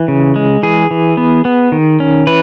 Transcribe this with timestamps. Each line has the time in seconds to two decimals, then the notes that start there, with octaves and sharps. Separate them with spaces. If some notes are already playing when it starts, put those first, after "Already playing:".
Already playing: E3
0.08 C#3
0.36 G#3
0.63 E3 G#4
0.91 E3
1.17 B3
1.45 B3
1.72 D#3
2.00 C#4
2.27 E3 B4